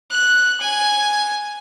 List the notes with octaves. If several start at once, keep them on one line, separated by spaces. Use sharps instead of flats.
F#6
G#5